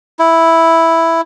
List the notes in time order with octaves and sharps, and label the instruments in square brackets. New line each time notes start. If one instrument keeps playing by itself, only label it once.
[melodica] E4